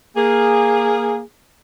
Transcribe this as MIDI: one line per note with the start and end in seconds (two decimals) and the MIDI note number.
0.16 1.20 58
0.16 1.20 68